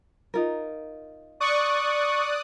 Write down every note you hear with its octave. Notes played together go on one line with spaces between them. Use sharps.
D#4 F4 A#4
D5 C#6 D#6 F#6